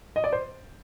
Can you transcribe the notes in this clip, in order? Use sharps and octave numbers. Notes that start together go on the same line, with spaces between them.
D#5
D5
C5